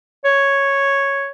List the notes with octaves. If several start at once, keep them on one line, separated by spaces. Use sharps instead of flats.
C#5